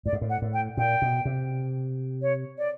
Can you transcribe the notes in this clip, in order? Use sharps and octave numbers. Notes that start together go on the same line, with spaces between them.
A2 D5
G#2
A2
F#5
A2
G5
A#2 G5
B2
C3
C#5
D5